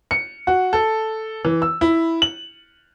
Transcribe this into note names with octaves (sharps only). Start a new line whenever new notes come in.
C#7
F#4
A4
E3
E6
E4
F#7